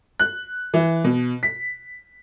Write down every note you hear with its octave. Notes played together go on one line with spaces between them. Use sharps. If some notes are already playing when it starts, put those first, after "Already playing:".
F#6
E3
B2
B6